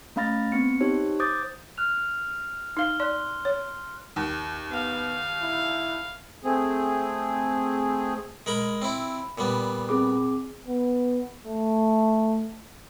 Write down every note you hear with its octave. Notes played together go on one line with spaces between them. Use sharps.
A3 C#4 F5 B5 A6 A#6
B3 C4 C#7
D#4 G4 C5 C#5
C5 D6 D#6 G6 A6
F6 F#6 F7
D#4 F5 F6 G7
D5 C6 F#6
C#5
D#2
B3 F5
E4
A3 C4 G#4
G#3 A#4 B5
C4 E4
A#2 G3 B3
C4 G#4 D6
B3
A3